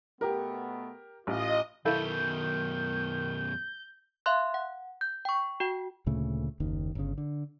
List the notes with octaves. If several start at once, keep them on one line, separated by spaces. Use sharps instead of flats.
B2 A3 B3 G4 A#4
A1 F4 D#5
F#2 B2 D#3 E4 A4 F5 G6
E5 F5 C6 F#6
F#5
G6
G5 C#6
F#4 G5
D2 A#2 C#3 A3
F#1 D#2 D#3
G1 C#3
D3